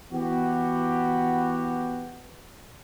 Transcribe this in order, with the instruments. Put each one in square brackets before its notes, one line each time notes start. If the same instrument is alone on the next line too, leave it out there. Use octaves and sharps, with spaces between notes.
[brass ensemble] E3 B3 F#4 G4